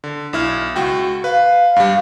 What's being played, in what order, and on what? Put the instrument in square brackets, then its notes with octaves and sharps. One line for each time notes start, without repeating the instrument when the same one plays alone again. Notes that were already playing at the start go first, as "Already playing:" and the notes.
[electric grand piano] D3
B1 E4 F6
C#2 F#4 G5
[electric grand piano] B4 [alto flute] F5
[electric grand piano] G2 G3